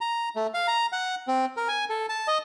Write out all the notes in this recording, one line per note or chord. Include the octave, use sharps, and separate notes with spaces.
A#5
A3
F5
A#5
F#5
C4
A#4
G#5
A4
A5
D#5